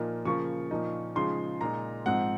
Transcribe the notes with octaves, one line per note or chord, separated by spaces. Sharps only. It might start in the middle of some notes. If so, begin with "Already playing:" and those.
Already playing: A#2 F3 A#3 D#4
C#3 F3 A#3 C#6
A#2 F3 A#3 D#4
C#3 F3 G#3 D#4 C6
A#2 G#3 D#4 A#5
G#2 F3 C4 D#4 F#5